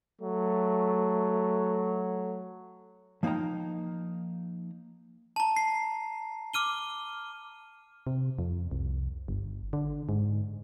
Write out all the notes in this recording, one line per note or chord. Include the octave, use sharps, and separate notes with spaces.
F#3 A3
F3 A#3 D#4 G5 A#5
A5 A#5
C7
D6 F6 D#7 G7
C3
F2
C2
G1
D3
G#2